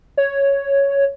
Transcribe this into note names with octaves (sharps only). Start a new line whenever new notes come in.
C#5